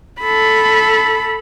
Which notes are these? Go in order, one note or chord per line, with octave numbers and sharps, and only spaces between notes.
A4 B5